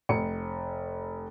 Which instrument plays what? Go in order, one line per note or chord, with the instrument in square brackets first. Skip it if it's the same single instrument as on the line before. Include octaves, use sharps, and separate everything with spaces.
[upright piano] F1 C#7